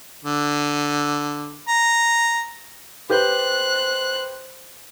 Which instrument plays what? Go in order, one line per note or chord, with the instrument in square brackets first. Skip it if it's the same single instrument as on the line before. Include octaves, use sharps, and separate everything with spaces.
[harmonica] D3
A#5
[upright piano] G4 B4 G6 [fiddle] C5 F#6